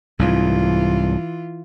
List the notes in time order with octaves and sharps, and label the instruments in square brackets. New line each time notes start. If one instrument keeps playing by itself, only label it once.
[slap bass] C2 G#2 [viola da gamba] E3 F4